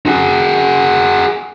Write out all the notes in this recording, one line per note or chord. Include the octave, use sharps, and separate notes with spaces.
F#4 G#4